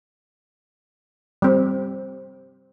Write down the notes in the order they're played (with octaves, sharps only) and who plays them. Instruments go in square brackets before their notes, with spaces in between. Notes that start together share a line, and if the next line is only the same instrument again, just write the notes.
[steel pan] G3 C4